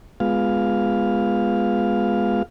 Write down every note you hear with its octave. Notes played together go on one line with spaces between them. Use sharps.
G#3 B3 F4 F5